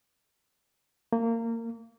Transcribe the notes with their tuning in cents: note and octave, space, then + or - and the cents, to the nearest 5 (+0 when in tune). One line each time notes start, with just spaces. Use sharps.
A#3 -25